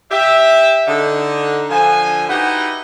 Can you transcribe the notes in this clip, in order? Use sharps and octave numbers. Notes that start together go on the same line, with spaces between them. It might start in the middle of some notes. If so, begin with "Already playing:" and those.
G4 E5
D3 D#4
D3 F3 G#5
D#4 E4 F#4 G4 B4 F#5